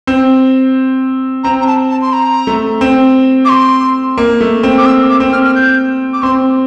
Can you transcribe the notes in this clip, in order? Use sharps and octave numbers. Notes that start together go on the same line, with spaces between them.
C4
C4 A#5
A#5
A5
A5
C6
A#5
A3
C4
D6
C6
A#3
A3
C4
D6
E6
D6
C4
F6
F6
G6
D6
C4 C6